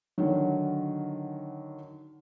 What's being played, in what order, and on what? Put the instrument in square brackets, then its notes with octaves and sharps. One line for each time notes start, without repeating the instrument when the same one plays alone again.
[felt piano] D3 D#3 F#3